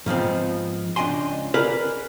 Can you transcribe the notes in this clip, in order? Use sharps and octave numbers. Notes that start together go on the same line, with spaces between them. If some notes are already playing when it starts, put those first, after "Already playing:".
G#2 F3 B3 C4
C#2 D4 D#5 G5 G#5 C6
G#4 A#4 B4 D5 D#5